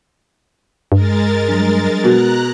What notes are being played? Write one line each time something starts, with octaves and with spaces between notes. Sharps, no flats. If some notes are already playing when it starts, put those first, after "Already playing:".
G2 G#3 A#4 A6
F#3 G3 D4
B2 A#5 F#6